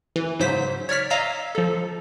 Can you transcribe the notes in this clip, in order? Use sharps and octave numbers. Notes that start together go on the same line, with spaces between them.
E3
G#2 C#3 F#3 C5 B6
C#5 D5 F6 B6
D#5 F5 A#5 E6 B6
F3 A4